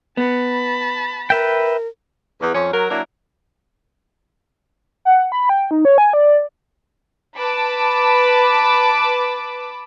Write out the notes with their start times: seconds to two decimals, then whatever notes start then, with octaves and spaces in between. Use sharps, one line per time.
0.17 B3 A5 B5
1.30 A#4 B4 E5 G5
2.42 E2
2.55 F2 C#4
2.73 F#3 A#4
2.91 F#3 A#3 D4 E4 A#4
5.05 F#5
5.32 B5
5.49 G5
5.71 D#4
5.85 C#5
5.98 G#5
6.13 D5
7.38 B4 A5 B5 D6